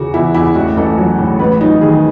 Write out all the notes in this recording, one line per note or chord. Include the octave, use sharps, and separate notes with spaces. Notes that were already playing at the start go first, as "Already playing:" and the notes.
Already playing: E2 C#3 E3 F#4
E2 E4
E2 E4
A1 F#4
A1 A4
F#3
A2
A1 B4
F#3 D#4
D#3 G#4